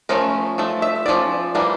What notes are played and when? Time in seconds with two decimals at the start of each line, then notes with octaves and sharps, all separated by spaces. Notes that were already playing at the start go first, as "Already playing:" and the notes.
0.09 F3 A3 C#4 A#4
0.58 F3 A3
0.82 E5
1.06 F3 A#3 C#4 D5
1.55 E3 G3 A#3 D4